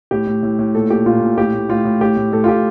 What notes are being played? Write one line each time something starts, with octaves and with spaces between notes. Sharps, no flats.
A2 G4
A2
A2
A2
A#2 A4
A#2 G4
A#2 F4
A#2
A2 G4
A2
A2 F4
A2
A2 G4
A2
A2 A4
F4
A2 G4